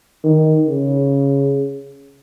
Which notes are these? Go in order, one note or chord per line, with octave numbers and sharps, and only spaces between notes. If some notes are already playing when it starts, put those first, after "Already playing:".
D#3
C#3